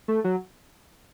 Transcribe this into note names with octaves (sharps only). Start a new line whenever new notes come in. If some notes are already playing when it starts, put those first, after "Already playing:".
A3
F#3